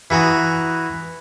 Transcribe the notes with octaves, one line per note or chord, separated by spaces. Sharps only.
E3 F#4 A#5 D#6